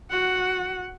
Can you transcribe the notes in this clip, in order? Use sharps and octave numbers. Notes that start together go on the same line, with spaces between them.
F#4 F#5